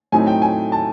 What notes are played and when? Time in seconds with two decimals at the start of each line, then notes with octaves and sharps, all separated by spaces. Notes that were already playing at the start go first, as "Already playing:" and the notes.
0.12 A2 F#3 A3 C4 D#4 G#5
0.27 G5
0.42 G#5
0.72 A5